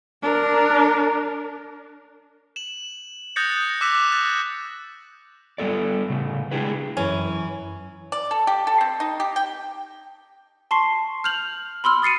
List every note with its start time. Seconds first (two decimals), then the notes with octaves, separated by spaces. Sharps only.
0.22 D4 A#4
2.56 E7 F#7
3.36 D#6 F#6 G6 A6 A#6 C#7
3.81 D6 E6 F#6 B6 E7
4.12 F#6 A6
5.58 G3 B3 A4 D5
6.10 A2 C#3
6.51 G#3 D4 E4 G4 G#4 B4
6.97 F#2 E3 C#4
8.12 D5
8.31 A4
8.47 G4
8.67 A4
8.81 C4
9.00 D#4
9.20 G4
9.36 G5
10.71 A5 C6 C#6 C7
11.24 F6 G6 F7 F#7
11.84 B5 C6 E6 F6
12.02 D#6 A6 C7 C#7 D#7